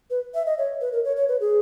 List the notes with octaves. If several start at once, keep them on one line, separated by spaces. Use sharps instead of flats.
B4
E5
D#5
C#5
B4
A#4
C#5
C#5
B4
G#4